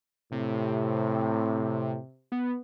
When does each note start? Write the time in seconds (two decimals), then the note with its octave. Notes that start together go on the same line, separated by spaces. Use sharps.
0.32 A2 C3
2.32 B3